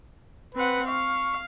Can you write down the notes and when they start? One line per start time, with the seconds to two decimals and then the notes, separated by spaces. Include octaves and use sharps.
0.55 C4 B4 F#5
0.88 F5 C#6